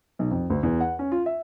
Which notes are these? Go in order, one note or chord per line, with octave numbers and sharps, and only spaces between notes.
B1
F2
D2
E2
F#5
C#4
F4
E5